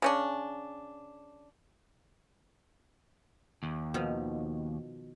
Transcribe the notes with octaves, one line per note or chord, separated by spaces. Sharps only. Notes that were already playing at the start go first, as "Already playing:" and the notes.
C#3 C#4 D4
D#2
B2 D#3 F3